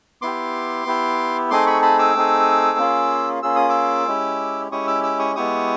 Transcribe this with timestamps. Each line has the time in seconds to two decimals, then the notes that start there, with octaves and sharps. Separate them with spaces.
0.22 B3 E4 G4 C6 D6
0.86 B3 E4 G4
1.50 A3 C4 D#4 G#4 C6 D6
1.67 B5 C#6
1.82 A5 B5
1.99 D6 E6
2.15 A3 C4 D#4 G#4
2.79 A#3 C#4 F4 G#4
3.43 A#3 C#4 F4 G#4 E6
3.56 D#6
3.69 D6 E6
4.07 G#3 C#4 E4 G4
4.71 G#3 C#4 E4 G4 C#6 D#6
4.87 D6 E6
5.03 D6 E6
5.19 C#6 D#6
5.36 G#3 B3 E4 G4 C#6 D#6